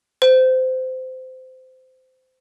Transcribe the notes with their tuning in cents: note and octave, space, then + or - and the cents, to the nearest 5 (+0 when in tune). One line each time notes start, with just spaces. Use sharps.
C5 -20